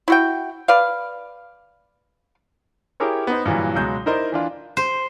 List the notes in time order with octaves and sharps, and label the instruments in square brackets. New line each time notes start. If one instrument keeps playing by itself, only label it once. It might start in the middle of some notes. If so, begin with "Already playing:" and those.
[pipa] E4 F#4 G5
B4 D5 F5
[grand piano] E4 G4 G#4 A#4 C#5
B3 D#4 C5
G2 A#2 E3 F#3
C#2 B2 F#3 G#3 G6
D#4 E4 A#4 C5 D5 D#5
E3 D4 F4
[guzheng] C5